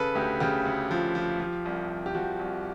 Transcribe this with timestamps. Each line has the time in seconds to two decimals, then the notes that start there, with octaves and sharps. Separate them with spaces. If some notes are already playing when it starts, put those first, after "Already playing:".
Already playing: C#3 A4 B4
0.15 D2 G4
0.40 C#3 G4
0.65 D2
0.91 F3
1.15 F3
1.40 F3
1.65 C2
1.90 C2
2.06 G4
2.15 F3 F#4
2.39 C2